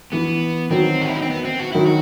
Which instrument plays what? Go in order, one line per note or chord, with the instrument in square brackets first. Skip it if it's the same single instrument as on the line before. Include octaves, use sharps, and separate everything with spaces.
[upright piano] E3 [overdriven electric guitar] B3
[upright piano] D#3 F#3 [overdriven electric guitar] C4
[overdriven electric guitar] F#4
E4
D#4
C4
B3
C4
F#4
[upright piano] D#3 F#3 [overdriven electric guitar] E4
[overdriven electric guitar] F#4